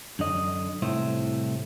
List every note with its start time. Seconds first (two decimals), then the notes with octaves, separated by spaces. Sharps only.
0.19 F#2 D3 D#5
0.82 C2 A2 C5 E5